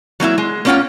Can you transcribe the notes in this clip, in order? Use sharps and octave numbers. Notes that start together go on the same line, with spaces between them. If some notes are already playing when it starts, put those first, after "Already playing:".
F#3 A#3 D#4 E4
G#3
A#3 B3 C#4 F4 F#5 G5